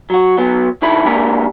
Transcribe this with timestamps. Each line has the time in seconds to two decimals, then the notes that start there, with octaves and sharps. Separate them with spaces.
0.10 F#3 F#4
0.38 F#3 B3
0.82 D3 D#3 E4 A4 B5
1.05 G#3 A#3 D4 G4 A#4